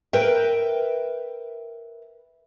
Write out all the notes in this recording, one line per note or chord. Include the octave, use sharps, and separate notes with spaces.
A#4 B4 E5 G5